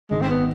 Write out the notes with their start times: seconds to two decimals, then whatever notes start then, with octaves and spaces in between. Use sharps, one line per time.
0.10 G#1 G#3
0.22 C4
0.29 B3